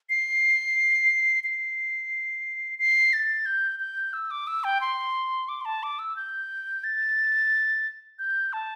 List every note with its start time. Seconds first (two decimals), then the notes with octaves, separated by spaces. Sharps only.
0.10 C7
1.44 C7
2.79 C7
3.13 A6
3.46 G6
3.80 G6
4.13 E6
4.31 D6
4.47 E6
4.64 G5
4.81 C6
5.49 D6
5.61 C6
5.65 A5
5.83 D6
5.99 E6
6.16 G6
6.84 A6
8.19 G6
8.53 A5